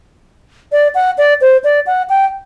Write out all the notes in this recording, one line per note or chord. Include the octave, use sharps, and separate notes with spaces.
D5
F#5
D5
C5
D5
F#5
G5